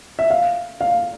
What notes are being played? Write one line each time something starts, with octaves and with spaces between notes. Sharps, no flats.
E5
F5
F5